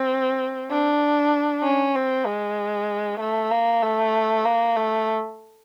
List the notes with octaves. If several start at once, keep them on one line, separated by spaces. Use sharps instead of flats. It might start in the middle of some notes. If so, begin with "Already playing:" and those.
Already playing: C4
D4
C#4
C4
G#3
A3
A#3
A3
A#3
A3